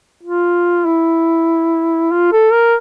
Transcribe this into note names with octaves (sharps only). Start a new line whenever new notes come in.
F4
E4
F4
A4
A#4